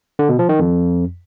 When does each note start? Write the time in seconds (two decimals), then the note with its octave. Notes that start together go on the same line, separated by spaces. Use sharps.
0.19 D3
0.29 B2
0.39 F3
0.49 D#3
0.59 F2